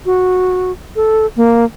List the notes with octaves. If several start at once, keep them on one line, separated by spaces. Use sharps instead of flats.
F#4
A4
A#3